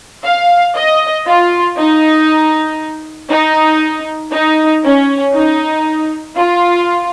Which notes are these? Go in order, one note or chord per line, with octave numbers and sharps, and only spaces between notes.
F5
D#5
F4
D#4
D#4
D#4
C#4
D#4
F4